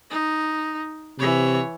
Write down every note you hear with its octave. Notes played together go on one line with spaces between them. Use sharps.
D#4
C3 E3 C#5